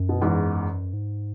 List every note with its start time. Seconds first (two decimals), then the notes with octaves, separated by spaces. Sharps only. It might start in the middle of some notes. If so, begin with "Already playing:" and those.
Already playing: F#2
0.09 B2
0.21 E2 G#2
0.93 G#2